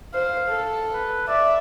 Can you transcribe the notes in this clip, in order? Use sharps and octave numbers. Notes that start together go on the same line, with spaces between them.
C5 F5
A4
B4
D5 E5